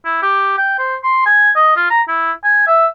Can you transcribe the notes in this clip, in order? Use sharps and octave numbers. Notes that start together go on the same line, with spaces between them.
E4
G4
G5
C5
C6
G#5
D#5
F4
A#5
E4
G#5
E5